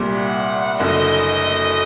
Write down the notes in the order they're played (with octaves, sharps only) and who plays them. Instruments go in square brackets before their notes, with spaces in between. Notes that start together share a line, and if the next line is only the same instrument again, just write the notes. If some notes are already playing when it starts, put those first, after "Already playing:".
Already playing: [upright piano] C2 A#2 G3
[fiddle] F#5
[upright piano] F#1 F#2 D3 [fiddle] D#5